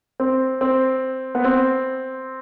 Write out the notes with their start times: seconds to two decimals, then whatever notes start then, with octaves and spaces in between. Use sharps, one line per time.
0.20 C4
0.61 C4
1.35 B3
1.44 C4